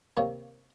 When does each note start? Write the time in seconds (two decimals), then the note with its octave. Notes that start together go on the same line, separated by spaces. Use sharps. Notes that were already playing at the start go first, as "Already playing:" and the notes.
0.17 C3 D#3 A#3 C#5